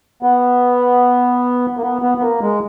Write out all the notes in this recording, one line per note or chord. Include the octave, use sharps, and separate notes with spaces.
B3
A#3
B3
B3
B3
A#3
G#3